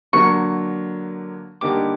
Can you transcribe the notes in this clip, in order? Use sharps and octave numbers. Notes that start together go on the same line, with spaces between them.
D3 F#3 A#3 C#6
D3 G3 A#3 D#4 G4 D6